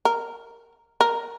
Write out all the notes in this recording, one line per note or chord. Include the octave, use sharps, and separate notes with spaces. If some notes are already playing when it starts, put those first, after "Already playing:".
A#4
A#4